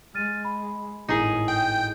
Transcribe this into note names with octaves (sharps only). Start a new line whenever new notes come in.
G#3 F6 A6 D#7
B5
G#1 A2 D#4 E4 G#4
G5